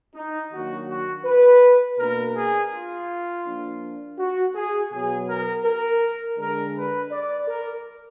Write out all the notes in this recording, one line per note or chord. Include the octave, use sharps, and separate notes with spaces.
D#4
D#3 F#3 A#3 D4 F#4
F#4
B4
B2 A#3 D4 A#4
G#4
F4
F3 A#3 D4
F#4
G#4
B2 F#3 B3 G#4
A#4
A#4
D3 G#3 D4 A#4
B4
D5
A#4